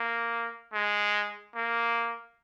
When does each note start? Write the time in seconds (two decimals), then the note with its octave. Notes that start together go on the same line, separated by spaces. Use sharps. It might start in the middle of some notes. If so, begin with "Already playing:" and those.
Already playing: A#3
0.73 G#3
1.56 A#3